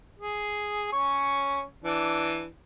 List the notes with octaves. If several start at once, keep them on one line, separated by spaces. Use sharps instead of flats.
G#4
C#4 C#5
E3 D4